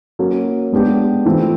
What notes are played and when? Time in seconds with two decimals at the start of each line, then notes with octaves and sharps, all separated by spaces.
0.19 F#3 A#3 C#4 F#4 A#4
0.72 G#3 B3 D4 G4
1.26 E3 A3 C4 F4